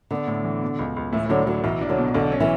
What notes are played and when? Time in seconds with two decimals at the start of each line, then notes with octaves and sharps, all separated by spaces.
0.11 D3 B3
0.27 A2
0.44 E3
0.62 B2
0.79 C#2
0.96 C#2
1.12 A2 E3
1.29 A2 D3 F#3
1.47 D3 F#3
1.64 B1 E3
1.81 D4
1.89 D3 F#3
1.98 B2
2.14 B1 D3
2.32 C#4
2.40 E3